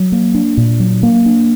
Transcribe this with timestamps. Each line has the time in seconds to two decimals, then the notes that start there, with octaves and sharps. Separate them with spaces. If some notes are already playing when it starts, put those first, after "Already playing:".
Already playing: F#3
0.12 A#3
0.34 D4
0.57 A#2
0.80 F#3
1.03 A#3
1.26 D4